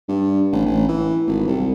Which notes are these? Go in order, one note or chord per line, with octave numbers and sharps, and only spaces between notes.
G2
A1
A1
E3
G#1
C2